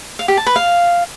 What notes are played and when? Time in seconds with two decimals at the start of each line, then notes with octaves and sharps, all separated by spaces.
0.19 F5
0.28 G4
0.37 A5
0.47 B4
0.56 F5